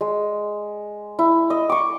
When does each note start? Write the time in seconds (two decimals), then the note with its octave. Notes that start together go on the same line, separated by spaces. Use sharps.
0.01 G#3
1.19 E4
1.50 D#5
1.69 C#6 D6